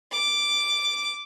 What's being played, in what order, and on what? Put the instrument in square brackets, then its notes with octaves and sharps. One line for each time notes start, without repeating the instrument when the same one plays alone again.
[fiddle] D6